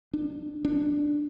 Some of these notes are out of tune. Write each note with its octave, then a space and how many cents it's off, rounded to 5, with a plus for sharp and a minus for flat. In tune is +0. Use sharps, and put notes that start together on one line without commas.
D4 +30
D4 +0